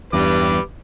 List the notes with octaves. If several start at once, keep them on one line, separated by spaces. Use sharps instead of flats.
E2 G2 G3 B4 D6